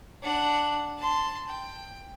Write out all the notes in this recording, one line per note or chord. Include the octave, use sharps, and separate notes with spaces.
D4 F#5
A5 C6
G5